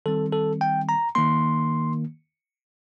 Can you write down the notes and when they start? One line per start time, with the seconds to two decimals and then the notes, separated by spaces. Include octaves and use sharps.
0.06 D#3 G3 C4 A4
0.33 A4
0.61 G5
0.89 A#5
1.15 D#3 A#3 C6